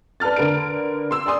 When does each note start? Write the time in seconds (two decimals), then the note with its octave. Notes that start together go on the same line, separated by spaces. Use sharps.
0.20 B4 D5 A5 F6 A6
0.36 D3 A#4 B4 D7
1.11 C6 E6
1.26 D5 G#5 C6 D#6